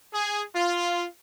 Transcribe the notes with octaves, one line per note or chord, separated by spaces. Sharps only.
G#4
F4